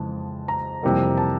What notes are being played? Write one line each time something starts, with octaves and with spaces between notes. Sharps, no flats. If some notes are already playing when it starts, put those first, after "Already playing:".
Already playing: F2 C#3 E3 G#3 A5
A#5
F2 C3 E3 G3 A#3
A5